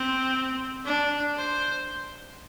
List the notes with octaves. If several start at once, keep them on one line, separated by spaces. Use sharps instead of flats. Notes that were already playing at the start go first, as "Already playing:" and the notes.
Already playing: C4
D4
C5